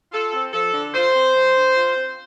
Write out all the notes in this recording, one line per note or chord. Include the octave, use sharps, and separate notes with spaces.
F4 A4
C4
F3 A4
D3
F4 C5
C4
F3
D3
F4
C4